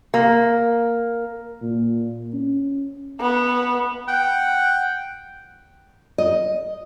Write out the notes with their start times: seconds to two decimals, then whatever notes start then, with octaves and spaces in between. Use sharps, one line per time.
0.14 A#3
1.62 A#2
2.33 C#4
3.20 B3
4.08 F#5 G5
6.18 D#5